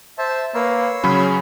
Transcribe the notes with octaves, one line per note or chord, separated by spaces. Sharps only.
C5 E5 A5
A#3 B4 C#5 C6 E6
C#3 F#3 C#4 G#4 B5